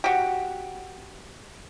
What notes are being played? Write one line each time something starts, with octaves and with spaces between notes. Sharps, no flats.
F#4 G4